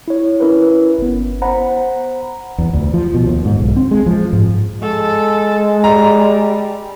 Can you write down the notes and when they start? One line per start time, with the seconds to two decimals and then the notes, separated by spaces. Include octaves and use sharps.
0.08 E4 C#5
0.40 C#4 E4 A#4 B4
0.99 G1 B3
1.42 C5 F#5 A#5 B5
2.58 E2
2.73 D2
2.94 F3
3.14 B2
3.26 D#2
3.45 G#2
3.59 B1
3.77 C4
3.91 G#3
4.06 F3
4.33 G#2
4.82 G#3 A4
5.84 G3 A#5